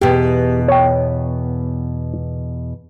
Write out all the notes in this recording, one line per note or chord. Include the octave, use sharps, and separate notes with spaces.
E2 B2 G4
C#5 G5